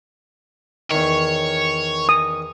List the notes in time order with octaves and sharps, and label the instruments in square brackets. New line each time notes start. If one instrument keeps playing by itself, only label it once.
[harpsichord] E2 D#3 [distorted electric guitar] C#5
[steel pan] D#6